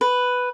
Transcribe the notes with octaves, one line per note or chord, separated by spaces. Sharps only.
B4